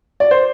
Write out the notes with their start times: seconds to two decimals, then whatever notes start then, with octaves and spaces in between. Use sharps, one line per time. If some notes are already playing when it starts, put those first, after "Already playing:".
0.20 D5
0.31 C5